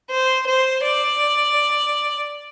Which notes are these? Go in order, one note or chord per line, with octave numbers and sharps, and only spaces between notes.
C5
C5
D5